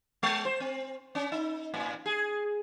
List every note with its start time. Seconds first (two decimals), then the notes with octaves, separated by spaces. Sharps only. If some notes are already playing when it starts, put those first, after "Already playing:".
0.23 G#3
0.45 C5
0.60 C4
1.15 C#4
1.32 D#4
1.74 A2
2.06 G#4